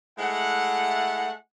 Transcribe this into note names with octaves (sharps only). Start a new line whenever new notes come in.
G#3 A3 E4 F#5